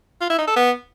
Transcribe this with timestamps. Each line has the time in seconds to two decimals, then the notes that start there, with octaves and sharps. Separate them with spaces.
0.21 F4
0.30 E4
0.39 D#4
0.47 A4
0.56 B3